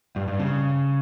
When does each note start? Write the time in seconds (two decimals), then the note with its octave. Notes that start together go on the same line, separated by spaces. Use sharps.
0.16 G2
0.28 G2
0.39 C#3